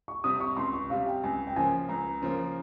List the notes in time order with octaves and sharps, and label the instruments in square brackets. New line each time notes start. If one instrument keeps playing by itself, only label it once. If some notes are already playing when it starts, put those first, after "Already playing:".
[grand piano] C#6
[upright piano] C3 G3 [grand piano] D#6
[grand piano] C#6
[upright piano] C#2 [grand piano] C6
[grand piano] C#6
[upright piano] C3 G3 [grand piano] F5
[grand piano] G5
[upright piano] C#2 [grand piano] G#5
[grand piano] G5
[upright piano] C#3 F3 A#3 [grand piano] G#5
[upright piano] C#2 [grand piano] A#5
[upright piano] C#3 F3 A#3